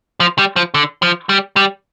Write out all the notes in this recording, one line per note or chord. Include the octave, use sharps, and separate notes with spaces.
F3
G3
F3
D3
F3
G3
G3